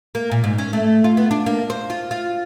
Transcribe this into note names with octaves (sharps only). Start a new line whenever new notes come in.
A#3
A#2
G#2
C#4
A3
F4
B3
D4
A#3
C5
F4
F4